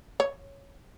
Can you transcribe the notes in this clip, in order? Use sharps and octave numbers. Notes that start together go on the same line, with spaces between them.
C#5